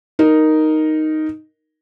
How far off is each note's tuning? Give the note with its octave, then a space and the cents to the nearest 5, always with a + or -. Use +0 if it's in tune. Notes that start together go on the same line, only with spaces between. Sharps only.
D#4 +0 A#4 +0